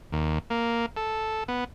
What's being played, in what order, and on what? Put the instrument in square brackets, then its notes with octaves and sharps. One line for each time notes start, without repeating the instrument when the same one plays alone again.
[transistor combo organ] D#2
A#3
A4
B3